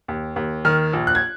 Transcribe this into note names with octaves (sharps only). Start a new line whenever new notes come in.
D#2
D#2
D#3 F6
A#1
F#6
G#6